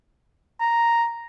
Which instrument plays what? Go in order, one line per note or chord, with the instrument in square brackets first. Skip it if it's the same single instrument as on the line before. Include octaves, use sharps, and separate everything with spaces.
[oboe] A#5